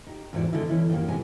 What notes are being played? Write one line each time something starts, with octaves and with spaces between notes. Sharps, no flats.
D#4 G4
E2 G#2 E4 F#4 D5
D3 D#3 G#3 E4 D#5
E3 C#4 E4
F#2 D#3 E3 A#3 G4
D2 C3 G#3 B3 G4 G#5